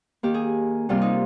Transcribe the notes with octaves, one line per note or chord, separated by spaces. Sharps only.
D#3 A#3 G4
G#4
C3 G3 A#3 F4
D#4